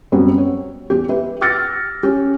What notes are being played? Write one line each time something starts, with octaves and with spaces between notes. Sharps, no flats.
F#2 G3 B3 C4
C#5
E2 G4
G4 B4 E5
D6 E6 F6 A6 A#6 C#7
C#4 G4